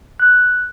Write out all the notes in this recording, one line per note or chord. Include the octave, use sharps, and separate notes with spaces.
F#6